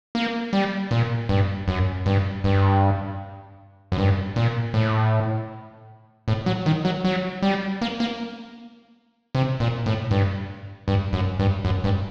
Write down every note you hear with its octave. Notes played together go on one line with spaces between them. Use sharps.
A#3
G3
A#2
G2
F#2
G2
G2
F#2
G2
A#2
A2
A2
F#3
D#3
F#3
F#3
G3
A#3
A#3
C3
A#2
A2
G2
G2
F#2
G2
F#2
G2